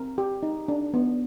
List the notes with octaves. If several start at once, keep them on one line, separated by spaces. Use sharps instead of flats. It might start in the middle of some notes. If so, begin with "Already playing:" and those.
Already playing: C4 A#4
G4
D#4
D4
B3